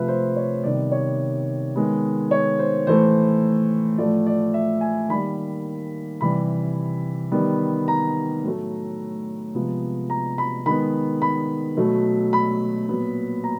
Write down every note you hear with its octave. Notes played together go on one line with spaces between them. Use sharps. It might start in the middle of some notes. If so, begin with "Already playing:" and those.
Already playing: C3 F3 A3 B4 E5
C5
C#5
C3 D#3 G3 B3 D5
C#5
D#3 G#3 B3
C#5
C5
A2 E3 A3 C5
A2 F3 A3 D5
D5
E5
G#5
D#3 G3 A#3 B5
C3 E3 G3 B5
D#3 G3 B3
A#5
A2 F#3 A3
C3 F3 G#3 B3
A#5
B5
D#3 G#3 B3 B5
B5
B2 F#3 A3
B5
A#2 F#3 B3
A#5